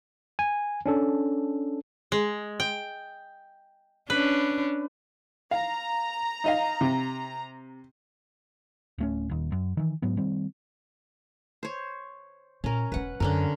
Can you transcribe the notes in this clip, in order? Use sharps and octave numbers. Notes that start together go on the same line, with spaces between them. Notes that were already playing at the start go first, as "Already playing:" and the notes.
G#5
C#4 D4 A4
G#3
G5
C#4 D4 B4
F5 A#5
D#4 D#5 F5
C3
D1 A3 C#4
D#1 D#2
F#2
D#3 E3
G#2 F#3 B3
D#3 G3 C4
C5 C#5
A#2 C#4 A#4
E1 C#4 B4 F#5
F#2 D3 F#3 C#4 A#4